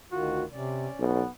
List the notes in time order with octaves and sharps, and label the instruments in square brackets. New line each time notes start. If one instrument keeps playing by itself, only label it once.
[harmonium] D2 D#3 F4 [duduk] F#4
[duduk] C3 [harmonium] C#4 D5
[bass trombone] B1 [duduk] B3